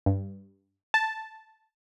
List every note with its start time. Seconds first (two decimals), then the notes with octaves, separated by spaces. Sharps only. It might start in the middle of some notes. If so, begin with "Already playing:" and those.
0.06 G2
0.94 A5